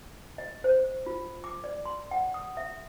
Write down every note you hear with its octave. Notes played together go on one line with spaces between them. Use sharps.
D#5
C5
F4
D6
D5
C6
F#5
D#6
E5